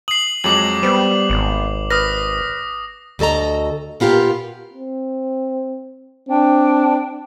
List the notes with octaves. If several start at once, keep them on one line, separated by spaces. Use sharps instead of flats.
D#6 C7 F#7
F2 F#3 G#3 D6 F#7
G3 B3 C5
G#1
B4 D#6 F6 A#6
D2 F#4 A4 D#5 A#5
A#2 B3 F4 G4 A#4
C4
C4 D4 G5